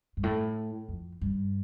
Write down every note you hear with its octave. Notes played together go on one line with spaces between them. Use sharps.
G2
A2
F2
G2